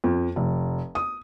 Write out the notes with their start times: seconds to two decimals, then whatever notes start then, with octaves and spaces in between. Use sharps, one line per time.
0.04 F2
0.36 F1
0.95 D#6